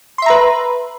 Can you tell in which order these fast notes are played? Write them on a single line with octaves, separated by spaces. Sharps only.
C6 E5 A#5 B4